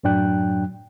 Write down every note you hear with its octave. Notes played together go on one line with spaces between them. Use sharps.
F#2 A2 F#3 D4 G5 F#6